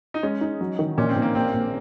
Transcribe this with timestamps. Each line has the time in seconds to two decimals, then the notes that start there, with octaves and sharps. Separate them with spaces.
0.14 D#4
0.23 G#3 C#4
0.41 D#4
0.61 F#3
0.79 D#3
0.98 A#2 C#4
1.09 C4
1.16 A#2
1.22 A#3
1.35 A#1 C4
1.54 A#1